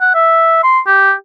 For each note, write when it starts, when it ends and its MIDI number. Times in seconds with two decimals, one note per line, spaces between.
0.01 0.12 78
0.14 0.63 76
0.63 0.79 84
0.87 1.13 67